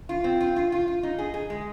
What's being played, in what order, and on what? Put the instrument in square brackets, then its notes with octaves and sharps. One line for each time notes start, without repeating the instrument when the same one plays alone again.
[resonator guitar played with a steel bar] F4
C4
F4
F4
F4
F4
D#4
G#4
G#4
G#3